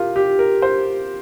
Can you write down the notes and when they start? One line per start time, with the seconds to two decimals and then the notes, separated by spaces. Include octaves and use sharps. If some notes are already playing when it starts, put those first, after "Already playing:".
Already playing: C3 F4 G4 A#4
0.16 G4
0.39 A#4
0.62 C5